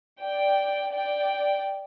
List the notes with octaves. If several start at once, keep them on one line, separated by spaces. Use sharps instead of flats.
D5 G5
D5 G5